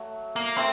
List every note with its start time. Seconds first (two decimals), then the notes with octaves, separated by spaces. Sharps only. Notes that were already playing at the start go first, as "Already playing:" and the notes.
Already playing: F#3 A3
0.36 A#3
0.58 A3 C4